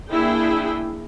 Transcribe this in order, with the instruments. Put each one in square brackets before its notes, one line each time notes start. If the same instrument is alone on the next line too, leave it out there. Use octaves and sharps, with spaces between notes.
[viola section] A#3 D4 E4 G#4 G5